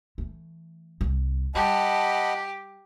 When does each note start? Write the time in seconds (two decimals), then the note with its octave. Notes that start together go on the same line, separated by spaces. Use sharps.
0.18 E3 A3
1.01 D#1 C2
1.55 G3 G4 D#5 F#5 A5 B5